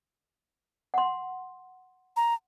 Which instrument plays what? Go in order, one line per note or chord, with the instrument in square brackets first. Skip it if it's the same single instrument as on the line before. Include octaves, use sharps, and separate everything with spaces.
[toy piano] F#5 C6
[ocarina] A#5